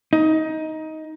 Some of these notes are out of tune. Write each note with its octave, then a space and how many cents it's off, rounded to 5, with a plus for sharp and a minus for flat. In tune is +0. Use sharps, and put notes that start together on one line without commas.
D#4 +15